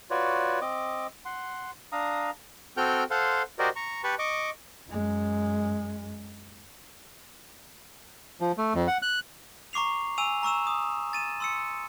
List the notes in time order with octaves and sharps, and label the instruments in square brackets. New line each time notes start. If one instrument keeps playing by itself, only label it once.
[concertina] F4 F#4 B4 C#5 D5
C4 D#5 D6
F#5 C6
D4 F5 A#5 D#6
[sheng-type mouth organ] C4 F#4 A4 G5 F6 G6
A4 C5 F5 F#5 C6
F#4 G4 A#4 C5 D5 D#5
A#5 C#6
G4 B4 A5 B5 C#6
D#5 C#6 D6
[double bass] F#2 G#3
[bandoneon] F3
A3
F2
F#5
F#6
[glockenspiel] A#5 C#6 D6 C7 F7
G#5 E6 D#7 F7
A#5 C#6 E6 E7
D#6
A6 D#7 E7
C6 E6 C#7